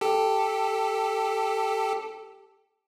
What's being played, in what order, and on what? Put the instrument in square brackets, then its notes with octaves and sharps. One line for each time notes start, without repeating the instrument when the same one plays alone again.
[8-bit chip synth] G4 A4